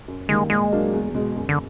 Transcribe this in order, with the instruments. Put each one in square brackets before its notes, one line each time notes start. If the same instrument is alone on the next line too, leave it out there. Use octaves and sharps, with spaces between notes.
[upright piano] F#2
[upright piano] D#3 G3 A#3 [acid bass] G#3
[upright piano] A#2 [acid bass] G#3
[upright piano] F#3 A#3 D4
E2
B2 G#3
F#2
[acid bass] D3